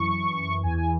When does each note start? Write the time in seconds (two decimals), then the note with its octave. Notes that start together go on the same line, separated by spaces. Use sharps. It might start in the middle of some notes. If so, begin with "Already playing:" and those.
Already playing: F#2 E3 C#6
0.63 E2 E3 G#5
0.77 G#5